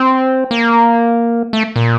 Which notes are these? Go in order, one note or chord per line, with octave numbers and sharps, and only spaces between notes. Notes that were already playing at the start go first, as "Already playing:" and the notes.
Already playing: C4
A#3
A3
A#2